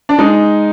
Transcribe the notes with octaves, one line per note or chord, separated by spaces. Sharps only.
D4
G#3 D#4